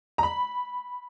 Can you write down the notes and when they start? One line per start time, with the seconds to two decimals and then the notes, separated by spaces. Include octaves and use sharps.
0.18 A#5
0.23 B5